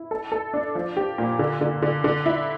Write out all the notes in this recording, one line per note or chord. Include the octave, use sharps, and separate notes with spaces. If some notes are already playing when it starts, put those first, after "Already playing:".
Already playing: E4
A4
A4
D4
F3
G4
A#2
D3
D3
D3
D3
E4